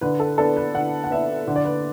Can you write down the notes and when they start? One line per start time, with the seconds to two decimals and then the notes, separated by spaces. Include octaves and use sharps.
0.01 D3 B4
0.20 A4
0.38 B3 D4 A4
0.56 B4
0.75 D3 F#5
1.04 F#5
1.11 B3 D4 E5
1.48 D3
1.56 D5
1.65 B4